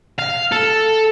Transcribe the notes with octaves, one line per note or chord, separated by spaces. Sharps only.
F5
A4